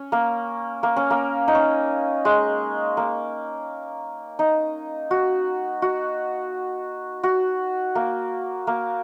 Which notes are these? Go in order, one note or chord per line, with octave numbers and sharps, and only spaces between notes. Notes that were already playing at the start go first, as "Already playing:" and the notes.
Already playing: C#4
A#3
A#3
C#4
A#3
D#4
C#4
G#3
A#3
D#4
F#4
F#4
F#4
A#3
A#3